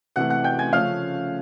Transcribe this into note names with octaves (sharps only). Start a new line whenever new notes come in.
C3 E3 A3 F#5 F#6
F#5 F#6
G5 G6
G#5 G#6
C#3 F3 A3 C#4 F5 F6